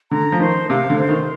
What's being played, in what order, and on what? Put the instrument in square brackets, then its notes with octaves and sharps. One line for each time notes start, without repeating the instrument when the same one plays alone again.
[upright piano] D3 [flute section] A#5
[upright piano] F3
[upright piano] D#3 [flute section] C5
[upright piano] C3 [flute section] F5
[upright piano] D3
[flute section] C5
[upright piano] D#3